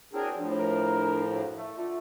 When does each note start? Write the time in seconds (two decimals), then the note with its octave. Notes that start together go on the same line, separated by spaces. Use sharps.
0.13 F#3 C4 D4 E4 G#4 A#4
0.38 A2 F3 D4
0.59 A#4
1.31 F#2
1.57 A3
1.77 D3 A3 F4